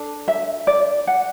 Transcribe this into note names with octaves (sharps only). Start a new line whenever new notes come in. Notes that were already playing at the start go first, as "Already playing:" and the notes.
Already playing: D4 A4
E5
D5
F#5